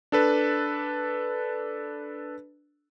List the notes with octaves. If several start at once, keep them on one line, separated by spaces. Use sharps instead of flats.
D4 A4 B4